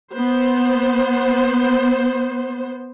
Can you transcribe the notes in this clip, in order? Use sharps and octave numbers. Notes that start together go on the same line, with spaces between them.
B3 C5